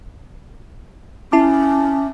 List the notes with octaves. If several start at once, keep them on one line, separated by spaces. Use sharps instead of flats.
C#4 E4 A5 D6